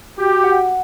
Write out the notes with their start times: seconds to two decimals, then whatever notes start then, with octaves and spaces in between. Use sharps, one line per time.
0.17 F#4 G4
0.44 F#5